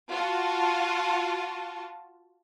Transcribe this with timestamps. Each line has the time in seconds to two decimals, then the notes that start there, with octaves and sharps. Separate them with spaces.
0.11 F4 F#4 A5